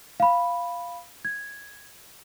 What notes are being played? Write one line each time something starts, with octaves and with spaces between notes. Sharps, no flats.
F5 B5
G#6